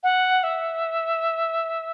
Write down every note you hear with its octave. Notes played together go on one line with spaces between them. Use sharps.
F#5
E5